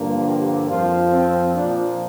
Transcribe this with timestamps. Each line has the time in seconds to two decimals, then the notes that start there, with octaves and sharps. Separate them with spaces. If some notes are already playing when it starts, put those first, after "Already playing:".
Already playing: G2 D3 F3 A#3
0.26 G4
0.68 F2 F3 C4 F4
1.12 C4
1.54 A#2 F3 A#3 D4